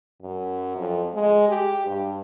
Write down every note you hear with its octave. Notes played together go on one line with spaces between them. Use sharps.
F#2
F2
G#3
G4
G2